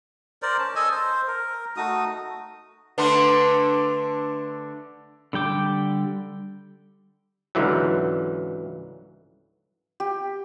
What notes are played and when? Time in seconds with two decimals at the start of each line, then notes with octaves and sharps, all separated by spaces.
0.42 A#4 C5 D5
0.59 C#4 A5
0.75 A4 D#5 G#5
0.91 C5
1.27 A#4
1.77 A3 D#4 F#4 D#6
2.98 D3 A3 D4 B4 C6
5.33 D3 G3 G5 D6
7.55 C#2 G#2 D3 E3 F#3
10.00 G4